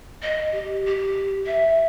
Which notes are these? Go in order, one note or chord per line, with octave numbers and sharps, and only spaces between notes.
D#5
G4
G4
E5